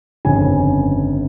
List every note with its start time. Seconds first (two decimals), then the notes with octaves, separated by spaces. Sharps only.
0.25 G1 F2 C#3 G#5